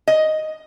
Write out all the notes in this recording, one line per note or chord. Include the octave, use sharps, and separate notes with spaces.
D#5